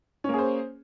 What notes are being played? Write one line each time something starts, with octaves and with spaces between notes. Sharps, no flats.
A#3 C#4 G#4 C5